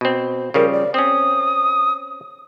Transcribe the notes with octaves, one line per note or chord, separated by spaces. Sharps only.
B2 C4
C#3 F3 G3 A#4
D5
C4 C#4 D#6